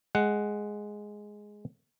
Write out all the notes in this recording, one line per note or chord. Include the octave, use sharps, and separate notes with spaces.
G#3 F#5